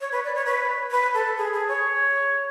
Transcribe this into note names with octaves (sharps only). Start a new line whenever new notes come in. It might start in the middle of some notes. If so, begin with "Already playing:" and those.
C#5
B4
D5
C#5
B4
B4
A4
G#4
G#4
C#5